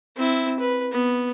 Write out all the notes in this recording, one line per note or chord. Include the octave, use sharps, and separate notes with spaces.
C4 E4
B4
B3